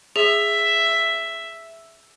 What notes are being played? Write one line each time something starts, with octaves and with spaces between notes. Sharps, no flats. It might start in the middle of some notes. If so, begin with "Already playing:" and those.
G#4 E5